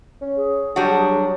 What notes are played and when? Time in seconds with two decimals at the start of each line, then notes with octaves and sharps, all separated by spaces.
0.21 C#4
0.37 G#4
0.76 F#3 G3 D4 F#4